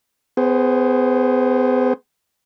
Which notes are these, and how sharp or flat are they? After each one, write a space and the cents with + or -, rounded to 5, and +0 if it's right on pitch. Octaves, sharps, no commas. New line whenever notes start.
B3 +40 G#4 +0 C5 +15